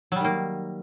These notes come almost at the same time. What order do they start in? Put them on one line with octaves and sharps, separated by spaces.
F#3 G3 D#3 A#3